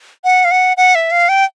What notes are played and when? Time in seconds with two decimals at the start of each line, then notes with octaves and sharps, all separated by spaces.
0.24 F#5
0.45 F5
0.51 F#5
0.77 F#5
0.95 E5
1.12 F5
1.29 G5